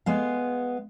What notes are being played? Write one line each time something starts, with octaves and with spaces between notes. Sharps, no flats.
G#3 B3 F5